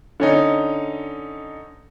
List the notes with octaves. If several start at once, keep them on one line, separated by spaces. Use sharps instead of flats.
D3 C#4 D#4